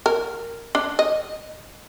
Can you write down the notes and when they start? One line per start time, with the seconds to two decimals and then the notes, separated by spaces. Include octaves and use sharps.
0.06 A#4
0.75 D4
0.99 D#5